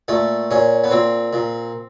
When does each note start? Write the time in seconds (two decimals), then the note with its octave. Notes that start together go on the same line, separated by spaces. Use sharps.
0.08 A#2 A3
0.51 A#2 C#4
0.84 B3
0.91 A#2 C4
1.33 A#2